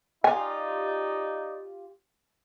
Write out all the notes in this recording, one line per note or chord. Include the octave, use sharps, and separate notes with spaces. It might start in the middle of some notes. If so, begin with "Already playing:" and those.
D#4 F4 G4 D5 G#5